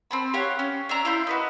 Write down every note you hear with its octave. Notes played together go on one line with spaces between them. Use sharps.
C4 A5 B5
G4 C#5 F5 F#5
C#4
D4 E5 A#5
E4 F4 C6 G6
F#4 B4 D#5